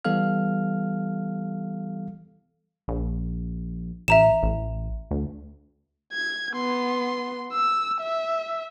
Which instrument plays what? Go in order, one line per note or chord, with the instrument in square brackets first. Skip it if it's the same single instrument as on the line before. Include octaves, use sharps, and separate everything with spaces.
[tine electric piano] E3 G3 B3 A4 F5 F6
[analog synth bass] A#1
[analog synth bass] A1 [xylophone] E5 A#5 E7
[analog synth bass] A1
D2
[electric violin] G#6
B3 C6
E6
E5